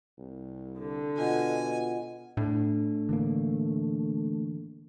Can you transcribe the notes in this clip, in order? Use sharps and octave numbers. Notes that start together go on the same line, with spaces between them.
C2
D3
B2 F4 D#5 F#5 G#5
A2 A3 D4
D3 E3 A#3